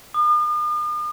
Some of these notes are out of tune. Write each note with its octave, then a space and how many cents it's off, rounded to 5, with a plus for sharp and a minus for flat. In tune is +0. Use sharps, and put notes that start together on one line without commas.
D#6 -45